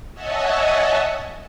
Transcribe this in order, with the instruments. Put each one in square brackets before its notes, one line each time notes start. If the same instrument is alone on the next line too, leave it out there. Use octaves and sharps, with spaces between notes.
[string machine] C#5 D#5 E5 F#5 G#5 A5